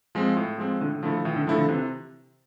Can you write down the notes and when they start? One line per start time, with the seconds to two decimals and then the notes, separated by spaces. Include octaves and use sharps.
0.15 F3 G#3 C4
0.37 A2
0.58 F3 G#3 C4
0.80 A2 D3
1.03 D3 F3 A3 E4 A4
1.25 A2 E3
1.36 D3
1.46 D3 F3 A3 E4 A4
1.58 D3
1.68 C3 E3